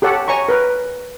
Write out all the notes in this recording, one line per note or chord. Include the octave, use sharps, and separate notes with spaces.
G4 A4 C#5 F#5
C#5 G#5 A#5 C#6
A#4 B4